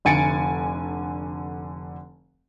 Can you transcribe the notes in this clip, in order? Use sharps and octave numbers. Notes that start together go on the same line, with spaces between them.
F1 D3 G#5 A6 C#7 D7